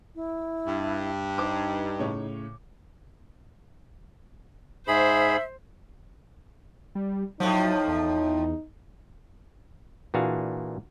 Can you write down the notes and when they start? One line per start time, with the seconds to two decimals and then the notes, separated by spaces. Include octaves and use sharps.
0.15 E4
0.67 G2 E5
1.38 D#4 G4 C5 D6
1.99 A2 C#3 C#5
4.88 G#2 G#4 C5 E5 B5
6.95 G3
7.40 A2 F3 F#3 D#4
7.88 E2
10.14 A#2 E3 D4 F#4 G#4 F5